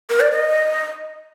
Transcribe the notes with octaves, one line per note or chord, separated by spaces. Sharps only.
A#4
D5
D#5